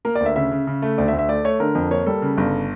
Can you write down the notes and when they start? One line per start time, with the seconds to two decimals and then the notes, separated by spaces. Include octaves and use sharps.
0.05 A#3 A#4
0.15 D5
0.20 D2
0.26 E5
0.36 C#3 E5
0.51 C#3
0.67 C#3
0.82 A3
0.98 D2 D5
1.08 E5
1.13 D2
1.19 E5
1.28 A3 D5
1.44 A3 C#5
1.60 D3 A#4
1.75 F2
1.91 A#3 C#5
2.06 G3 A4
2.22 C#3
2.37 G1